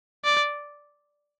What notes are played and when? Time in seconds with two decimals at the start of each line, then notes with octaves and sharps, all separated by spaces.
0.24 D5